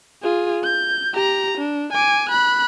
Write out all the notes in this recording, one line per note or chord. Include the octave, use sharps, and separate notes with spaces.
F4 G#4
G6
G4 A#5
D4
G#5 D6
B5 F#6